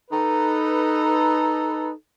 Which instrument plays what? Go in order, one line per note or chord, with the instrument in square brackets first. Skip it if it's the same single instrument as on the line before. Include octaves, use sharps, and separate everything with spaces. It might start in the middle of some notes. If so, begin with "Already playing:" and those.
[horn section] D#4 A4 B4